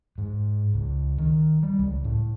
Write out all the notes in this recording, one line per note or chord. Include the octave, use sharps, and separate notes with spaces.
G#2
C#2
D#3
G3
C#2
A2